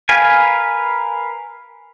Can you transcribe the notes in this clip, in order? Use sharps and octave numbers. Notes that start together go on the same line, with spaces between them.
A#4 B4 F5 G#5